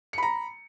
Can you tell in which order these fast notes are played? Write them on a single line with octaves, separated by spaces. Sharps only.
C#7 B5 A#5